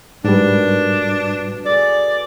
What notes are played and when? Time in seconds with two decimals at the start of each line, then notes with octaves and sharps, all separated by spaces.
0.24 G#2 B2 G3 D4 A#4
1.66 G#4 A4 D5